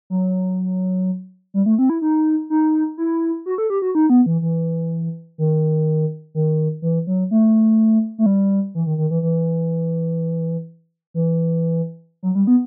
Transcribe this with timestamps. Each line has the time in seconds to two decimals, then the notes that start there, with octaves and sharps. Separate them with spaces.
0.10 F#3
1.54 G3
1.66 A3
1.79 C4
1.90 E4
2.02 D#4
2.50 D#4
2.98 E4
3.46 F#4
3.58 A4
3.70 G4
3.82 F#4
3.95 D#4
4.10 B3
4.26 E3
4.42 E3
5.38 D#3
6.35 D#3
6.82 E3
7.07 F#3
7.31 A3
8.18 A3
8.26 G3
8.75 E3
8.87 D#3
8.98 D#3
9.11 E3
9.23 E3
11.14 E3
12.23 F#3
12.35 G3
12.47 B3